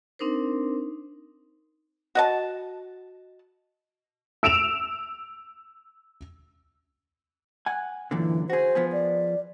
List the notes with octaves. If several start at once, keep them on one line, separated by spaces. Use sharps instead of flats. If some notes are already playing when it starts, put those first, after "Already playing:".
C4 D4 D#4 A#4 C5
F#4 D#5 A5
E6 D7 E7 F7
F#5 G#5
F#2 A#2 D3 E3
F#4 G#4 C5
F3 B3 G#4
D5